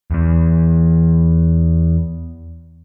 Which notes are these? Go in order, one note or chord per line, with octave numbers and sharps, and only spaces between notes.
E2 E3